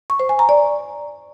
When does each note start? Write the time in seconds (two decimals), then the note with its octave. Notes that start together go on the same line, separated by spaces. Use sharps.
0.10 C#6
0.20 C5
0.29 G#5
0.39 A#5
0.49 D5